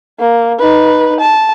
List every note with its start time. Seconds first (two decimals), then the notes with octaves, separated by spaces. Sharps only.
0.19 A#3
0.59 D#4 B4
1.20 A5